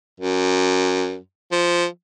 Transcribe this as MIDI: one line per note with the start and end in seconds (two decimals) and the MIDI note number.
0.20 1.18 42
1.52 1.85 53